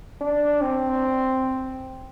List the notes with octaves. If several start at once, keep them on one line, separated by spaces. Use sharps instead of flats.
D4
C4